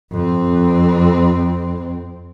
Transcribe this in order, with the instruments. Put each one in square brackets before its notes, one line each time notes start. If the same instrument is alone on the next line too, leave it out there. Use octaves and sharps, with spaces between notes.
[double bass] F2 C4